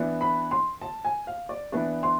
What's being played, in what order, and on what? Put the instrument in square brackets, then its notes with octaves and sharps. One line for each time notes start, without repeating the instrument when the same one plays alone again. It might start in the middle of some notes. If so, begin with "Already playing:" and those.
Already playing: [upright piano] E3 B3 D4
B5
C6
A5
G#5
F5
D5
E3 B3 D4 D5
C6